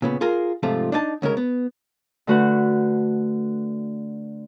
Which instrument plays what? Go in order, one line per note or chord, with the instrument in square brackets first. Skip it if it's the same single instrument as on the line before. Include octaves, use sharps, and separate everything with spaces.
[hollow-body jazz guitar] A#2 C#3 B3
F4 G#4 A#4
G#2 C3 F3 A3 F4
D4 D#4 D#5 A5
D2 C#3 G#3 A#4
B3
[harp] D3 A3 F#4 B4 F#5